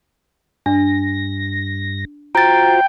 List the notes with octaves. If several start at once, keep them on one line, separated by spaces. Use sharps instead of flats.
G2 D4 A#6
F4 F#4 C5 G5 A#5 A6